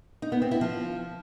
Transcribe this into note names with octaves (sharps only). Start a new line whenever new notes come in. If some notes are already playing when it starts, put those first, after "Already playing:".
D#4
B3
C4
E4
F3